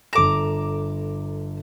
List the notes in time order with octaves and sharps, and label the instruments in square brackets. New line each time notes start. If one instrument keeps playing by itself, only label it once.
[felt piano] G1 A4 E7 [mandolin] A#5 D6